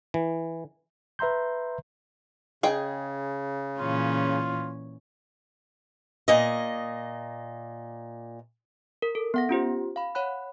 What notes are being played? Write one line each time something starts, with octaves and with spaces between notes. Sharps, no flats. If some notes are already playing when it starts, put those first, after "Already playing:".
E3
B4 E5 A#5 C6 G6
C#3 G#4 D#5 G5
A#2 E3 C#4 F4
A#2 D#5
A#4
A4
B3 F#5 A#6
C#4 F4 G4 C5
F5 B5
C#5 F#5 B5 F#6